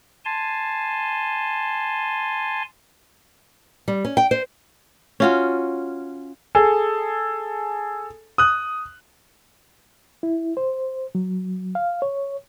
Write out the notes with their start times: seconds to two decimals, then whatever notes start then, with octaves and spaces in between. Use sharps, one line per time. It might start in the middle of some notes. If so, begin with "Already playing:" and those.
0.25 G#5 A5 C6
3.88 G3
4.05 C#4
4.17 G5
4.31 C5
5.20 C#4 F4 F#4
6.55 G#4 A4
8.38 D#6 F#6
10.23 E4
10.57 C5
11.15 F#3
11.75 F5
12.02 C#5